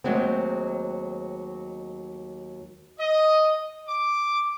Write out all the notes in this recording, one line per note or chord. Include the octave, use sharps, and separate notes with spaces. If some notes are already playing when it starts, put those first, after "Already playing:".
D#2 F#3 G#3 A3 C4
D#5
D6